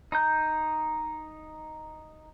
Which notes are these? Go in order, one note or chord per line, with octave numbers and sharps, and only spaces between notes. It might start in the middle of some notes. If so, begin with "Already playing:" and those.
D#4 A#5 G6